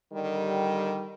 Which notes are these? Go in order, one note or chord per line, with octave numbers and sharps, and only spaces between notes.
D3 D#3 G3